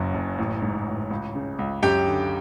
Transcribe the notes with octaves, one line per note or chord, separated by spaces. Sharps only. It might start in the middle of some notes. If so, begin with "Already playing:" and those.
Already playing: F#1 F#2
F#1
A1
G#2
A1
C#2
C#3
C#2
F#2 G4 G5
D3